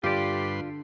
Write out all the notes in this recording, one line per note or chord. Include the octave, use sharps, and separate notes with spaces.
G2 D3 F4 G4 B4 D5 C6